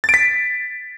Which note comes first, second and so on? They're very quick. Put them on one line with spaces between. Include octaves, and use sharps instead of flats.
A6 D7 B6